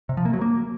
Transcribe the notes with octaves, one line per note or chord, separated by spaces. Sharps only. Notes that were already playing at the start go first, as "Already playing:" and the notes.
C3
F3
A#3
F#3
A#3